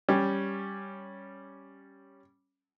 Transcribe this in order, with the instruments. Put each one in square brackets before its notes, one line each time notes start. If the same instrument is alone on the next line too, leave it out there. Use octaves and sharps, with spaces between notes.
[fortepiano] G3 C#4